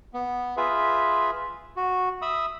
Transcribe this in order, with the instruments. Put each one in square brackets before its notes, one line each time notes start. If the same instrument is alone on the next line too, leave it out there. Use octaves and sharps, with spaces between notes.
[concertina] B3
F4 G#4 B4 E5
F#4
E5 B5 D#6 E6